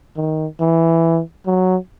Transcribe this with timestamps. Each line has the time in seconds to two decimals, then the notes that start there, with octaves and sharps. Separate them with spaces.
0.16 D#3
0.60 E3
1.46 F#3